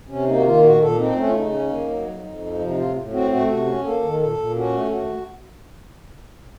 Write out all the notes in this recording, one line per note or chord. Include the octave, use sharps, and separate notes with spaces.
C3 C#4
A#3 D#4
F#4
D#3 F4
A#2 F#4
A#2 A4
C4 D#4
A3 C#4
F4
C#3 D#4
C#4
A#3
F#3
F2
F2
F3
C3
D#4
A2 F4
A2
C4 F#4
A3 F#4
C3 F#4
C#4
A#3 A4
D#3
A#2 A4
A#2
C#4 F#4
A3
A4
D#2 F#4